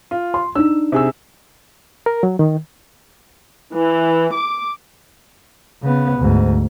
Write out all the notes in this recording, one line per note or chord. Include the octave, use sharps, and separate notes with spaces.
F4
C6
D4 D#4 E6
C3 G#4 E6
A#4
F#3
D#3
E3
D6
C#3 B3
D2 G#2